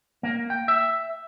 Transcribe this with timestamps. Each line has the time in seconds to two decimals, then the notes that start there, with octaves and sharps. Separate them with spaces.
0.23 A#3
0.50 G5
0.68 E5